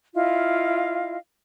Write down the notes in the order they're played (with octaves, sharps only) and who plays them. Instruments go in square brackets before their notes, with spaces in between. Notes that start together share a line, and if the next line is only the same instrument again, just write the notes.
[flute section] E4 F4 D#5 F5